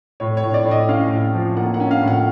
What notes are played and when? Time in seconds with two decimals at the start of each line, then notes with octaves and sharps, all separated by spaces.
0.20 A2 C#5
0.37 C#5
0.44 A2
0.54 D5
0.66 A2
0.71 D#5
0.89 C#4 F5
1.11 A2
1.34 F3
1.57 A#3 F#5
1.74 F#5
1.80 C#4
1.91 F5
2.02 A2
2.08 F#5